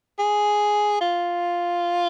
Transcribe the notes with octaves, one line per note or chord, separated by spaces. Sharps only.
G#4
F4